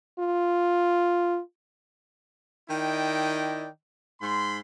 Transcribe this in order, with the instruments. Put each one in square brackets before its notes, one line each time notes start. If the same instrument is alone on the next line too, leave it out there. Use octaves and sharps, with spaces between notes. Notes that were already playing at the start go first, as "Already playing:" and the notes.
[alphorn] F4
[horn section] D#3 E4 D5 D#5 G5
G#2 B5 C6